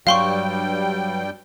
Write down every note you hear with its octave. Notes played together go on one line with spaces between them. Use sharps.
G2 F#3 G3 F5 G5 C6 C#6